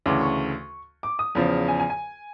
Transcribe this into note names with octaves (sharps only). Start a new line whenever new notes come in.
D2 C#3 E3 D6
C#6
D6
D#6
E2 C#3 F3
G#5
G#5
G#5